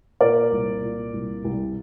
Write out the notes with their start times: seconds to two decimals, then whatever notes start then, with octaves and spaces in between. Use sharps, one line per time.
0.21 A#2 A#4 D5
0.52 C2
0.82 A#2
1.14 C2
1.44 C2